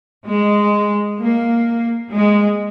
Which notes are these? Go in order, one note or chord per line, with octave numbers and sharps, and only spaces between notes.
G#3
A#3
G#3